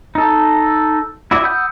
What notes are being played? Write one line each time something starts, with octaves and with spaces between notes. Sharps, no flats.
D#4 A4
E4 F#4 D5 E5
F#5 B5 D#6 E6 G6